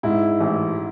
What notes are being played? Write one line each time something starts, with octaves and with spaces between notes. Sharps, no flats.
G#2 E4
A1